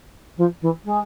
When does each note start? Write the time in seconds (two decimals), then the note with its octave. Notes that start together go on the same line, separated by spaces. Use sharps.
0.37 F3
0.62 E3
0.85 G#3